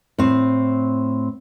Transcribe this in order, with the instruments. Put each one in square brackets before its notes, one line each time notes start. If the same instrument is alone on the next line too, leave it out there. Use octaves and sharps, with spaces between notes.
[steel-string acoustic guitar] A2 C4